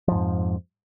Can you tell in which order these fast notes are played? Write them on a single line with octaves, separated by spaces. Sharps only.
F3 G#2 F2